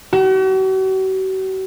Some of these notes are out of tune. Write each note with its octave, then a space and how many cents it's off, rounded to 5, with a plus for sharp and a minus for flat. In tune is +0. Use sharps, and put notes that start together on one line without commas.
F#4 +45